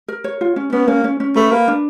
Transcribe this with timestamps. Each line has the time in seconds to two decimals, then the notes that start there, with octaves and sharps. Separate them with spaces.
0.08 A#4
0.24 C#5
0.41 F4
0.56 C#4
0.72 B3 C#4
0.88 A#3 C#4
1.04 C#4
1.20 C#4
1.36 A3 B4
1.51 A#3 B4
1.68 D4